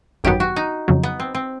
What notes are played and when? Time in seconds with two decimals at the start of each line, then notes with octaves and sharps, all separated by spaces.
0.24 G#1 F#2 D#3 F#3 B3 G4
0.40 F#4
0.56 D#4
0.88 F2 C#3 F#3
1.03 B3
1.20 C4
1.35 C4